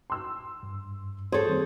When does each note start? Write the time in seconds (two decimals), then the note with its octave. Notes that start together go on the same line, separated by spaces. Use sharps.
0.10 C6 E6
0.63 G2
1.32 G#4 A4 C5 C#5
1.48 D#3 G3 C4